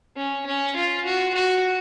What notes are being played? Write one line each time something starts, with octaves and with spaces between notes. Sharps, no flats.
C#4
C#4
F4
F#4
F#4